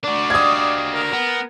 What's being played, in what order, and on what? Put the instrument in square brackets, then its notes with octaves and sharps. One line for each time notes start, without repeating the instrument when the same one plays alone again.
[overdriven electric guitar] D4 F#4 [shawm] D5
[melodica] G4 D#5 F5 [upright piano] D#6 G#6
[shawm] A#4
[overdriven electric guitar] B3